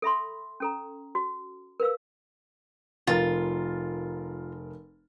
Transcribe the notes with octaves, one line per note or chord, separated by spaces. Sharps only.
A4 E5 B5 C6
C#4 A4 A#5
F#4
A#4 B4 F5 E6
F1 F4 A#4 A6